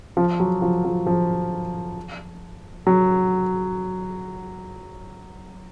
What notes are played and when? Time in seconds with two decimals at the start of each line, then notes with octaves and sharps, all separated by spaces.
0.17 F3
0.40 F#3
0.62 F3
0.85 F3
1.07 F3
2.87 F#3